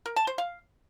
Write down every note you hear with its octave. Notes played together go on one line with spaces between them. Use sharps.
A#4
A5
C5
F5